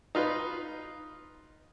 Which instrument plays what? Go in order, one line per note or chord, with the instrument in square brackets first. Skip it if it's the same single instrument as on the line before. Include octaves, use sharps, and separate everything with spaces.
[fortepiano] D#4 F4 B4